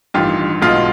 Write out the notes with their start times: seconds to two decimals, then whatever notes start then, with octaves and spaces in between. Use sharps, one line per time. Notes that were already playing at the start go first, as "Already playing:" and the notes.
0.14 A1 G2 D#3 F4 G4
0.62 B1 B2 G#3 F4